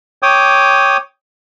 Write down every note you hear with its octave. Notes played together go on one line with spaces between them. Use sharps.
C#5 G5 D6 D#6